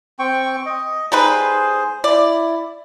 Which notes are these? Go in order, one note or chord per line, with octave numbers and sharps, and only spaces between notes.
C4 G5 C#6
D#5
G3 D#4 G#4 B4 C5
E4 D5